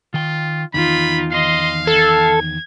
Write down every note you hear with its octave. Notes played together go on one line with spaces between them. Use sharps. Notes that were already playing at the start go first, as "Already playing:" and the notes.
D#3 F4 G5
E2 D#3 D#4 F4 B5
D#5 F5 C6
A4 G#6